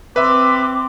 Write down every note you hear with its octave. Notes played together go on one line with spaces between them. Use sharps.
C4 B4 E5 D6